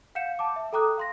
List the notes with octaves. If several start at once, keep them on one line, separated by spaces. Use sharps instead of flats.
F5 F#5 G6 C#7 E7
A5 D6
E5
A4 G5 A#5 D6 D#6 F#6
F5 C6 A#6